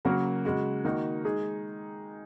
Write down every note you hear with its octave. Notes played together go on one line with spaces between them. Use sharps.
C#3 F#3 A#3 F#4 A#4
C#3 G#3 F#4
D#3 A#3 D#4 F#4
G#3 D#4 G#4